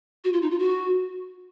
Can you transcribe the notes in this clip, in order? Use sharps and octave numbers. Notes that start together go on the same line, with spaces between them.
F#4
F4
D#4
F4
F#4